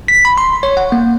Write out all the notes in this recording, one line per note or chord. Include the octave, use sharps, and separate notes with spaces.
B6
B5
C6
C#5
F#5
A#3